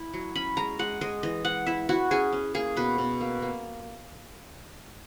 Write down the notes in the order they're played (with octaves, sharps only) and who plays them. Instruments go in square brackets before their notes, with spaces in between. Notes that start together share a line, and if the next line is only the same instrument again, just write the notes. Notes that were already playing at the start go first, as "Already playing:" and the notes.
Already playing: [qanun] E4
F#3
C#4 B5
G#3 A#5
G#3 F#5
G#3 D#5
E3 D#5
G#3 F#5
E4 E5
E4 F#4
C#4 G#4
C#4
A#3 G#4
B2 B4
B2
A#3
A#3